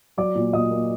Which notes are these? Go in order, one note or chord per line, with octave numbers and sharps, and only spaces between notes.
F#3 D5 D6
A#2
A#2 D#5 D#6
A#3